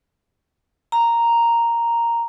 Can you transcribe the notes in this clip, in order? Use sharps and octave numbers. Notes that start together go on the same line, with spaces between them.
A#5